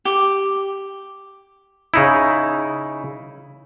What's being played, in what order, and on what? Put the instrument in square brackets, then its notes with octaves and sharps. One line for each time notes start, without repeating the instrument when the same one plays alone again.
[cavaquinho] G4
[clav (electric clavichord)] C#3 D#4 E4